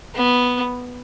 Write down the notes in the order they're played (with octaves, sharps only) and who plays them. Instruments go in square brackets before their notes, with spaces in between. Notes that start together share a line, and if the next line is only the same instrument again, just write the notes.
[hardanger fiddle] B3